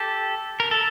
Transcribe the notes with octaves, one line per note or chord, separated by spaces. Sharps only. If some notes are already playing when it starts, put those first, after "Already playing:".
Already playing: G4 A4
A#4
A4